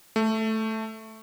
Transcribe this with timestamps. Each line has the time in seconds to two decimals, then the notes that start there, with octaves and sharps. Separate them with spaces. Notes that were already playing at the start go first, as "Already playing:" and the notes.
0.16 A3